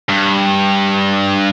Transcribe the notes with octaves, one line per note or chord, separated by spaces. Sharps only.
G2